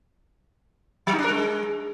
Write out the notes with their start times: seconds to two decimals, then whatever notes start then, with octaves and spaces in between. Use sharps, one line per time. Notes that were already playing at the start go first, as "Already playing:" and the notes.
1.07 F#3
1.13 D#4
1.19 D4
1.24 A#4
1.30 G#3